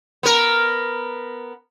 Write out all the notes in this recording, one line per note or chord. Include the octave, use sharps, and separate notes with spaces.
B3 A#4